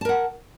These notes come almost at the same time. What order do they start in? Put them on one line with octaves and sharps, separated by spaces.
A5 A#4 F#5